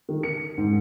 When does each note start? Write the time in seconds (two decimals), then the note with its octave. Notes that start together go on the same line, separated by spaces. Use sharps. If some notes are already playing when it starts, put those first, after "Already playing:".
0.09 D#3
0.23 C#7
0.58 G#2